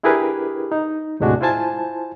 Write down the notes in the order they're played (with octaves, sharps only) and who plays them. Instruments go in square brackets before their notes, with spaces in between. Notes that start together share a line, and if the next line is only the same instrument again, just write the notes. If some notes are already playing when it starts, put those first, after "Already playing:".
[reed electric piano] D4 E4 G4 G#4 A#4 B4
D#4
D#2 A2 C3 G#3 D4 F#4
E4 F4 C5 G#5 A5